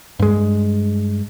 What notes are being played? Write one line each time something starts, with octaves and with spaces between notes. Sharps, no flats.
G2 G#3